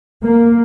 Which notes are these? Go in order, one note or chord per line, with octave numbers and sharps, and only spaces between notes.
A#3